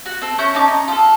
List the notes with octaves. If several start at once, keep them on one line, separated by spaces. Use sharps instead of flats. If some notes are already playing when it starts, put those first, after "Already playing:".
F#4
C4 A4
C#4 E4 C#6 G6
C#4 D#4 A5 D6
D#4
F4 A4